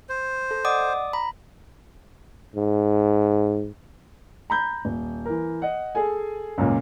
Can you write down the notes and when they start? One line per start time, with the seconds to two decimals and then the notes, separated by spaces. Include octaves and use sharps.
0.09 C5
0.51 A4
0.65 D5 D#5 F#5 D6 D#6
1.13 A#5 B5
2.56 G#2
4.50 A#5 B5 G6
4.85 D#1
5.26 E3 A#4
5.62 D#5 F#5
5.95 G#4 A4 G#5
6.58 C#2 F#2 A#2 A#3